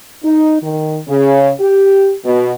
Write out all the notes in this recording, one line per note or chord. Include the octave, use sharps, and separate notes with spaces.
D#4
D#3
C#3
G4
B2